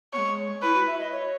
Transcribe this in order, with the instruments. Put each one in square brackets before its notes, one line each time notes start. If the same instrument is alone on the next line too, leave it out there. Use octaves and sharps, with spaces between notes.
[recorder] B3 [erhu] C#5
[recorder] G#3
[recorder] E4 [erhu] B4
[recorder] F#4
E5
D#5
C#5